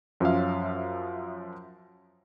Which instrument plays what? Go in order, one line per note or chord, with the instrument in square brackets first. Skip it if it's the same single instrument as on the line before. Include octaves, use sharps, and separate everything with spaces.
[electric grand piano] F#2 F3 C#4 F4 E5 F5